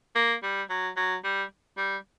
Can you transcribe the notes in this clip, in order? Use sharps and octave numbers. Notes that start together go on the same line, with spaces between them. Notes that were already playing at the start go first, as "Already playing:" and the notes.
A#3
G3
F#3
F#3
G3
G3